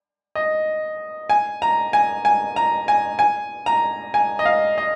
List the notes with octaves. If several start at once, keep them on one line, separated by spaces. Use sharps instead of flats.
D#5
G#5
A#5
G#5
G#5
A#5
G#5
G#5
A#5
G#5
D#5
F5
D#5